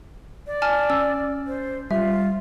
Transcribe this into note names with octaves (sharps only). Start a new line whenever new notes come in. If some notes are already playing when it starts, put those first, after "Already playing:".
D5
G#5 A5 F6
C#4 E6
C5
G3 F4 E5